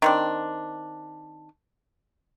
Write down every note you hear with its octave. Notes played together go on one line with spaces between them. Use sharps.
D#3 C4 D4